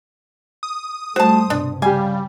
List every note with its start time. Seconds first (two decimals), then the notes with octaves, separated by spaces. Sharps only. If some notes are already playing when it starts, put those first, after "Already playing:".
0.63 D#6
1.16 G3 A3 F#4 C5 A5
1.50 C2 G2 B2 D4
1.82 C#3 G3 G4 F5 G#5